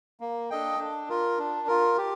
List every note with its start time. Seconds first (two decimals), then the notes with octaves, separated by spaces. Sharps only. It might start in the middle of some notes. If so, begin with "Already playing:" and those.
0.20 A#3
0.50 D4 A4 D#5 G5
0.79 D4
1.09 F4 A#4
1.38 D4
1.67 F4 A#4
1.98 G4